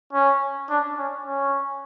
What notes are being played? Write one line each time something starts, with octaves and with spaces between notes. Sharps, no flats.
C#4
D4
C#4
C#4